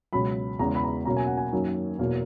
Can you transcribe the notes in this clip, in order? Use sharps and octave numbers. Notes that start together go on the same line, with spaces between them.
C#2 B2 F#3 C#4 B5
E2 C#3 G#3 B3 A#5
B5
A#5
B2 F#3 A#3 C#4 A#5
G#5
F#5
G#5
F#2 D#3 F#3 A#3
E2 B2 F#3 A#3